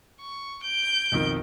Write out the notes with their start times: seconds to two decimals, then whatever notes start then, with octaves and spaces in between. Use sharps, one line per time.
0.20 C#6
0.63 G6 D7
1.12 B1 F2 D#3